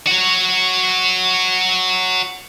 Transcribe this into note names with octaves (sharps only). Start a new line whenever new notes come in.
F#4 C#5